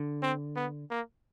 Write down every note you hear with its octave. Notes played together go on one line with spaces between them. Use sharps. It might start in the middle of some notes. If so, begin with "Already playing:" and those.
Already playing: D3
C4
B3
A#3